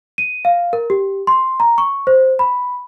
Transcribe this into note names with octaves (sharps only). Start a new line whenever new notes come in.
D#7
F5
A#4
G4
C6
A#5
C#6
C5
B5